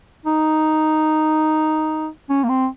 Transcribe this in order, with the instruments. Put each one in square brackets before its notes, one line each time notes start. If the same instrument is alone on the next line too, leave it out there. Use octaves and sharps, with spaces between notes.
[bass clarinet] D#4
C#4
A#3
C4